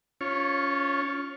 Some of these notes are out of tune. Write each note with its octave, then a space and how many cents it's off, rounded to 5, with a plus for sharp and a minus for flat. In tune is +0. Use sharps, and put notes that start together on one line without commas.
C#4 +20 F4 +0 C#5 -15